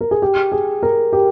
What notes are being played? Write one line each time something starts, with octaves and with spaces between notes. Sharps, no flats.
A#4
G#4
G4
G#4
A#4
G4